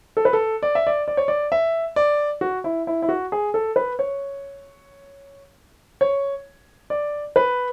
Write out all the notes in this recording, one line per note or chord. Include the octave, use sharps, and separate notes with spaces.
A4
B4
A4
D5
E5
D5
D5
C#5
D5
E5
D5
F#4
E4
E4
E4
F#4
G#4
A4
B4
C#5
C#5
D5
B4